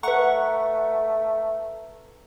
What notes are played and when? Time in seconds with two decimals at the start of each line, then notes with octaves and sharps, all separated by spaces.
0.03 A3 B4 F#5 A#5 C#6